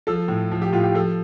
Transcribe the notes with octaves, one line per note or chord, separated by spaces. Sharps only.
F3 A4
A2
F3
G4
A2 F4
G4
F3 A4